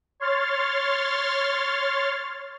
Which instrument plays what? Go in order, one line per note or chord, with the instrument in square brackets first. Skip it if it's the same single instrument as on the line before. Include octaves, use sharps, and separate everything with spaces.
[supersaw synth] C#5 C6 F6 A6